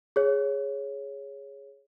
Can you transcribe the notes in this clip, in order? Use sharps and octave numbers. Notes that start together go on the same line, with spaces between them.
G#4 C#5